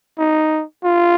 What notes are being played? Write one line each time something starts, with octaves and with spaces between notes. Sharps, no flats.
D#4
F4